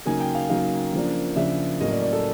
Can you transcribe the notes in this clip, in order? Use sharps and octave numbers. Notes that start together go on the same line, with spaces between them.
C#3 F#3 A#3 D#4 G#5
G5
F5
C#3 F#3 A#3 D#4 F5
C#3 F3 A#3 D4
C#3 F3 A#3 D4 E5
A2 F#3 A#3 C#4 D#5
D5
D5
A4